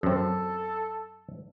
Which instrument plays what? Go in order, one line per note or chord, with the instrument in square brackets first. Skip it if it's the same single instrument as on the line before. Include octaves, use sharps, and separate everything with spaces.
[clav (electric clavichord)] F#2 C4 [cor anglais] A4